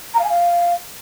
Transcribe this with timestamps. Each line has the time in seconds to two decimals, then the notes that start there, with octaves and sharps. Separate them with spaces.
0.14 A#5
0.19 F5
0.24 G#5
0.29 F5